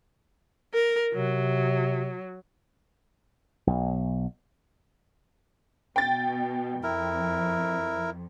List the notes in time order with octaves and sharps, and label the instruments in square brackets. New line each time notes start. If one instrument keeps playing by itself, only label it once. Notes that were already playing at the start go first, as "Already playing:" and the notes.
[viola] A#4
[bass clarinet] C3 [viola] F#3
[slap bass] B1
[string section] B2 [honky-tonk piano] G5 A6
[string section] F2 [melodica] E4 A#4